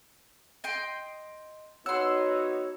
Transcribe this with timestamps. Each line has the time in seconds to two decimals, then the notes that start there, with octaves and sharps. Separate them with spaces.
0.64 D#5 G5 C6
1.86 B3 D#4 F#4 C#5 F#5 C6 E6